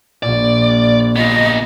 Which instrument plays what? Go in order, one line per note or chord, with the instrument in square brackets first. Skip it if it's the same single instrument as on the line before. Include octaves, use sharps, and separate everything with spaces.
[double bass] A#1 [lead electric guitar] D5
[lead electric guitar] B3 F4 [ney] D#5